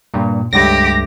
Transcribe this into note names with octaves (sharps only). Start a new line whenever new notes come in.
G2 A#2
C#2 G2 A3 G4 D6 A#6